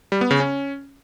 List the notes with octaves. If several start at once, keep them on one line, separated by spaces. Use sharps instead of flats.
G3
B3
C#3
C#4